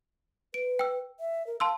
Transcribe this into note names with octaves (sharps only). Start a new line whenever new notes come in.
B4 D7
G5 E6
E5
A#4
F5 A5 C6 E6